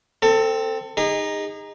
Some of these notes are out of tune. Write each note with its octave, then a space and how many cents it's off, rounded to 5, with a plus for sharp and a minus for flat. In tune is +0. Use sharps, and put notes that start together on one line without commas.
C4 +0 A4 +25
D#4 +0 G#4 -35